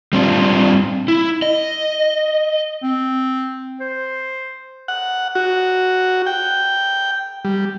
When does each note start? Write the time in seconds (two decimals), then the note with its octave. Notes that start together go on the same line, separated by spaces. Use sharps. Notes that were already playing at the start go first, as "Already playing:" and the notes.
0.13 G3 C4 D4 F4
1.08 E4
1.42 D#5
2.82 C4
3.81 C5
4.88 F#5
5.35 F#4
6.26 G5
7.45 G3